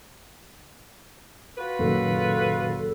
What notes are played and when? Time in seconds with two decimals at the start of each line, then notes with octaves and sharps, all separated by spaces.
1.57 F4 F#4 B4
1.79 F#1 A#2 D#3 F#3 A4